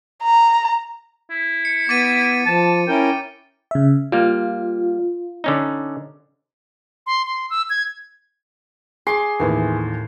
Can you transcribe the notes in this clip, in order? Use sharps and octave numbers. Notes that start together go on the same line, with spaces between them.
A#5
E4
C#7
B3 D6 A6 D#7
F3 A5
C#4 E4 A#4 G5
C#3 E5
G3 A#3 F4
D3 C#4 D#4
C6
C6
E6
G#6
G#4 C6 D6
D#2 A2 E3 A3 C4